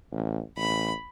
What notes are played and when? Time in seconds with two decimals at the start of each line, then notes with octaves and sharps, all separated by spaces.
0.12 A1
0.57 A1 B5